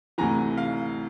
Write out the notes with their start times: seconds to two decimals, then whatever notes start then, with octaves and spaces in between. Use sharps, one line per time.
0.18 D2 C3 E3 G#5 A#5
0.57 F5